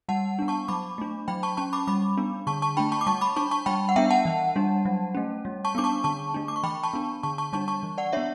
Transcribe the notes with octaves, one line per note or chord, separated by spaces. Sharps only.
G3 F#5 A5
B3 D4
A5 C#6
F#3 B5 D6
A3 D4
F#3 G5 B5
A5 C#6
C#4 A5 C#6
B5 D6
G3 B5 D6
B3 D4
D3 A5 C#6
A5 C#6
A3 D4 G5 B5
A5 C#6
D6
G3 A5 C#6
B5 D6
D4 A5 C#6
A5 C#6
G3 G5 B5
F#5
B3 D4 E5 G5
F#5 A5
E3
G3 D4
F#3
A3 C#4
G3
A5 C#6
B3 D4 D6
A5 C#6
D3 A5 C#6
A3 D4
D6
C#6
E3 G5 B5
A5 C#6
B3 D4
D3 A5 C#6
A5 C#6
G3 D4 A5 C#6
A5 C#6
E3
D5 F#5
B3 D4 C#5 E5